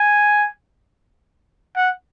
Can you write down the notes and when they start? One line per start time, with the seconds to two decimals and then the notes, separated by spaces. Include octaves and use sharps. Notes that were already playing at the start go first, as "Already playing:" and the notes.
Already playing: G#5
1.76 F#5